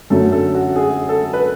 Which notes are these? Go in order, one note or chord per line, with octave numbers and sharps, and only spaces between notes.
F#2 D3 F#3 A3 C#4 A4
A4
F#4
G#4
A4
B4